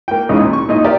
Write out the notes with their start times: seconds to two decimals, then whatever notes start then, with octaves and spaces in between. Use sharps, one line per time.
0.08 A#3 G5
0.29 C#2 C#3 E3 D#4
0.40 A#2
0.53 C#6
0.69 A#2 D#4 D#5
0.84 G4 A#4 D5 E5